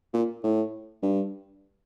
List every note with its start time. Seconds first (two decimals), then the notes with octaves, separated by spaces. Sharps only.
0.13 A#2
0.44 A2
1.02 G2